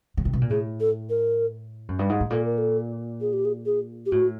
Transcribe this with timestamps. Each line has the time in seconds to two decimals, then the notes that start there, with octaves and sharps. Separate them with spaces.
0.17 C#3
0.25 C3
0.33 B2
0.41 A#2
0.50 A2 G#4
0.80 A4
1.10 A#4
1.88 F#2
1.99 G2
2.09 G#2
2.20 A2
2.30 A#2 A4
2.45 A#4
2.58 A4
3.21 G#4
3.33 G4
3.45 G#4
3.66 G#4
4.06 G4
4.12 A2 F#4